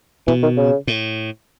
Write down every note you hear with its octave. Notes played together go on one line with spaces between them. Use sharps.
B2 E3
D#3
C#3
A2